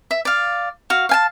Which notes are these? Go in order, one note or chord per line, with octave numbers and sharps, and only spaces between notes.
E5
D5 F5
F#4 F5
F5 G#5 A5